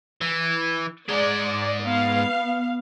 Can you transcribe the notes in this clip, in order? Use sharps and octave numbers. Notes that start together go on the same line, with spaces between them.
E3
G#2 G#3 D5
B3 F5